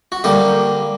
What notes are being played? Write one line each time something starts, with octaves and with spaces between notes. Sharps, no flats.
F#4
D3 G3 A#3 G4